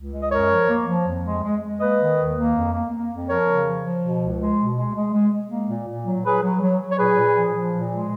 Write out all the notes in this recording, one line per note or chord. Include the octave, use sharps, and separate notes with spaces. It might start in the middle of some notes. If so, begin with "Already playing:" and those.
Already playing: C#2
G#3
D#5
F#2 A#4 C#5
F3
A#3
F3
F2
G#3
G#3
G#3
A#3 B4 D#5
D#3
D#2
A#3
F2
A#3
A#3
F2
F3 A#4 C#5
C#3
F3
F3
B2
C#2
G#3
B2
G#3
G#3
G#3
G#3
A#3
A#2
A#2
F#3
F#3 G#4 B4
F#3
F#3
F#3
C#5
A#2 G#4 B4
A#2
F3
F3
A#2
G#3